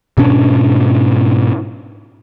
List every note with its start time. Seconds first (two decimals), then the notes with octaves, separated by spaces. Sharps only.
0.17 G#2 B2 C#4 D4